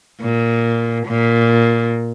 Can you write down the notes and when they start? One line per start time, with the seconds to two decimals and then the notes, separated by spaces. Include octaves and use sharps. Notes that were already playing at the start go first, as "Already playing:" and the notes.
0.21 A#2
1.07 A#2